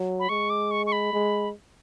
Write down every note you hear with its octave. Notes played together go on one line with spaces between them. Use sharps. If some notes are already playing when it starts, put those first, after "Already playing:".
Already playing: F#3
B5
G#3 C#6
D6
C#6
C#6
B5
G#3